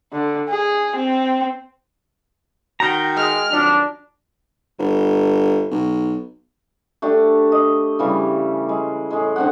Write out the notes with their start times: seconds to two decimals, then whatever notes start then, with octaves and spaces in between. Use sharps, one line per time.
0.13 D3
0.49 G#4
0.96 C4
2.80 D#3 F#4 G5 A#5
3.17 G#3 F6
3.51 F2 D#3 F#3 D4
4.79 G1
5.71 B1
7.02 A3 D4 G4
7.52 D#5
7.99 C#3 E3 G3
8.69 G#3
9.11 A2 G#3
9.36 D3 C4 F#5